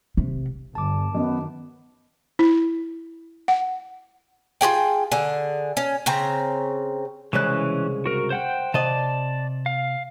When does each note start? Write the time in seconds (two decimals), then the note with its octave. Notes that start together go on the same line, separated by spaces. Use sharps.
0.17 C3
0.75 G1 A5 D6
1.14 F#2 D#3 B3 D#5
2.39 E4
3.48 F#5
4.61 F4 G4 G#4 G5
5.12 D3 G#4
5.77 C#4
6.06 C#3 C4 A#5
7.33 C2 C#3 E3 G#3 C#4 F#6
8.06 F#4 A#4
8.30 C5 F#5 G5
8.74 C3 D5 D#5 A5
9.66 F5